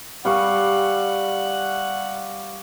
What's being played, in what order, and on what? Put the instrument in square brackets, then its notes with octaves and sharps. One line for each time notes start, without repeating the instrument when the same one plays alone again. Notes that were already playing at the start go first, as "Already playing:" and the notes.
[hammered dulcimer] G3 F5 C#6 [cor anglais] F#5